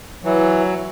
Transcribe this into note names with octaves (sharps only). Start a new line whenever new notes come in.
E3 F#3